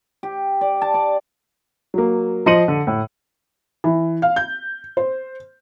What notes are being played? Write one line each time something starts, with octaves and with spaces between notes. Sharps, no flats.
G4
D5
A5
D5
F#3 A#3
F3 D#5 C6 C#7 D#7 F#7
D3
A2
E3
F5
G6
C5